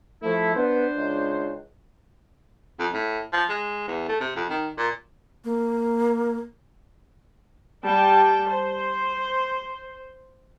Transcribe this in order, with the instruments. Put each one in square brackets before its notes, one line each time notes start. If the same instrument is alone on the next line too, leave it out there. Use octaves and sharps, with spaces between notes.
[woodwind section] F3 E4 [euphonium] A3
[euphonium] B3 [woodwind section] D4 C5
[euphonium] C#2
[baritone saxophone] F2
A2
F3
G#3
E2
A3
C3
F2
D#3
A#2
[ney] A#3
[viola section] G3 G5 A5
C5